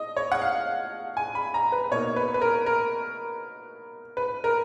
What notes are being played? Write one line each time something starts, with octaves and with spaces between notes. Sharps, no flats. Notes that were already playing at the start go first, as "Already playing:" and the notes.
Already playing: D#5
C#5
F#5
F5
G#5
B5
A#5
B4
B2 A#3 D#4 C#5
B4
B4
A#4
A#4
B4
A#4